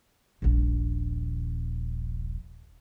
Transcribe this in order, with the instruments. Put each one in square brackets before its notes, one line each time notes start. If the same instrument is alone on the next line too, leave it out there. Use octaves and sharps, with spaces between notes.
[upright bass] D#1 A#1